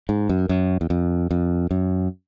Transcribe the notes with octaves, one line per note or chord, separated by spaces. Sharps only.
G#2
F#2
F#2
E2
F2
F2
F#2